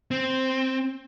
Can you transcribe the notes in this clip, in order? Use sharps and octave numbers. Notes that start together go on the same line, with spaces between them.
C4